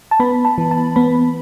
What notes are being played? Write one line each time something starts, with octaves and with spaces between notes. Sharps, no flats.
A5
B3 B5
A5
E3
A5
B3 B5